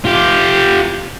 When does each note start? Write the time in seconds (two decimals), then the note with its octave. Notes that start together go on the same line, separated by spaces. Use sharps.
0.05 F4 G4